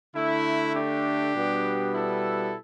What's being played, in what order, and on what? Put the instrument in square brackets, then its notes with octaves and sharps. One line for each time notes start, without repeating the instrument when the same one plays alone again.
[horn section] D3 A3 E4
D4 G4
B2 G3 B3
E4 A4